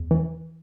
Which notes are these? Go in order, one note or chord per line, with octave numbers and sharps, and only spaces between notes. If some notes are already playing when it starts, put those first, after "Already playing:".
Already playing: E2
E3